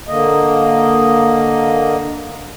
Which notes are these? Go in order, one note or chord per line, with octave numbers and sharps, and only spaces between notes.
D3 A#3 D#5